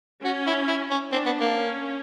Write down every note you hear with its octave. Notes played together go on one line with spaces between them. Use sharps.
C#4 F#4
E4
E4
C#4
C4 D4
B3
A#3
C#4